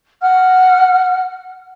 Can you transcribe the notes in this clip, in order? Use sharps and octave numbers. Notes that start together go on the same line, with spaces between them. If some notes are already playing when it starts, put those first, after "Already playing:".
F#5 F6